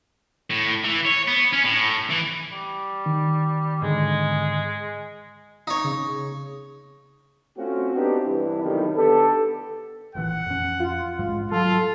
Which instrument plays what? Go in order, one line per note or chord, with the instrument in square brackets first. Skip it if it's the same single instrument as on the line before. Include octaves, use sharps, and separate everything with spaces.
[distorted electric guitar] A2
E3
C#5
B3
C#4
A2
E3
[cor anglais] G3
[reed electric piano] D#3
[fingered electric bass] G#2 D3 [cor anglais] G#3
[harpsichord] D#4 C#5
[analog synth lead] C#3
[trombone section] A3 C4 C#4 F4 F#4
B3 C4 D4 D#4 F#4 G4
G2 C3 E3 D4 E4
B1 F2 A2 C3 D#3 G3
D3 B3 G4 A4
[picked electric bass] A1 A#2 E3 [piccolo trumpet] F#5
[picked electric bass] F2 C#4
[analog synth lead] F4
[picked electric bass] A#1 G#2 G#3
[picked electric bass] F#3 G3 [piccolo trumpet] F4 [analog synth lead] A4